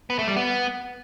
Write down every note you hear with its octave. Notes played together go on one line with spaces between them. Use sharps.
B3
A3
G3
B3